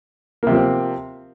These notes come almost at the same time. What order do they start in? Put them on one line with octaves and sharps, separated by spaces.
A#3 C3 F3 C4